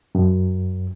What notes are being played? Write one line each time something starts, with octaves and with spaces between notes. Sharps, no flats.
F#2